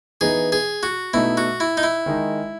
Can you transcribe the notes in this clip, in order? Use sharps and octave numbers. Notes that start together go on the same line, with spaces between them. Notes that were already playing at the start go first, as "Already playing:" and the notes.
E3 B3 D#4 G#4
G#4
F#4
B2 A3 D#4 E4
F#4
E4
D#4
E4
D#3 G#3 D#4